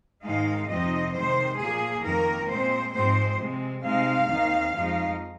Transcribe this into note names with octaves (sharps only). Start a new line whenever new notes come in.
G#2 D#3 G#3 D#4 F5
F2 C3 F3 C4 D#4 D#5
C3 D#3 G#3 C5
A#2 F3 A#3 G#4
F2 D#3 A#3 A#4
A#2 G#3 C4 C5
G#2 F3 G#3 C4 C5
C3 G#3 C4
C3 G#3 C4 D#4 F5
D#2 D#3 C4 D#4
F2 F3 G#3 D#4